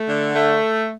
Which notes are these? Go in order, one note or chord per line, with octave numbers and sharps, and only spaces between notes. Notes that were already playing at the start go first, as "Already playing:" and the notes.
Already playing: A3
D3
A3